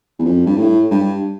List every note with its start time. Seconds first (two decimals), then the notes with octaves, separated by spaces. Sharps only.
0.19 E2
0.25 F2
0.46 G2
0.57 A2
0.91 G2